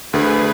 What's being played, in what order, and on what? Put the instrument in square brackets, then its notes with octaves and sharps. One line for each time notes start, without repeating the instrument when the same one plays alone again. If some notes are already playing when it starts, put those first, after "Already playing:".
[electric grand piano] D2 [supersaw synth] G#4 B4